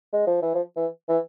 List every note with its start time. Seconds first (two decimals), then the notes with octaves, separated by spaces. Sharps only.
0.13 G#3
0.27 F3
0.42 E3
0.54 F3
0.76 E3
1.08 E3